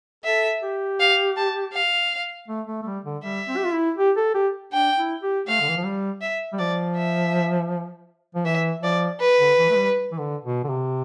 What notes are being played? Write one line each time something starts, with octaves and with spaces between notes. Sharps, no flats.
A4 E5
G4
F5
A5
F5
A3
A3
A3
G3
D3
G3 E5
C4
G4
F4
E4
G4
A4
G4
D4 G5
E4
G4
A3 F5
D3
E3
F3
G3
E5
G3
F3 D5
E5
F3
E3 E5
F3 D5
B4
D3
E3
A3
G3
E3
D3
B2
D3
C3